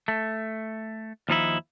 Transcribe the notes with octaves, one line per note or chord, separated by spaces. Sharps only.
A3
D#2 F3 D#4 E4